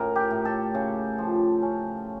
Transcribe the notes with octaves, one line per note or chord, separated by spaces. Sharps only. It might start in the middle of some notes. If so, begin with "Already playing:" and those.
Already playing: A2 C#4 A#4
G4
A2
A4
C#3
F3
C#4